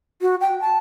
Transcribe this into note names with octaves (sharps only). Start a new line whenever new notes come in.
F#4
G5
A5